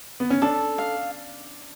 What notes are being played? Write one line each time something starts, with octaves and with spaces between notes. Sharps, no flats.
B3
C#4
D4 A4
F5